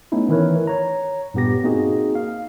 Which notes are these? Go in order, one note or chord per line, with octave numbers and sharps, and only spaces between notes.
A3 B3 C#4 D#4 E4
D#3 E3 E4 A#4 B4 C#5
C#5 A#5
G2 A#2 B3 G4 A#6
A#3 C4 D#4 F#4 G#4
F5